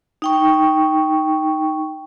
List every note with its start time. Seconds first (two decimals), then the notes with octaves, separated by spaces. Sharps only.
0.22 D#4 G5 C#6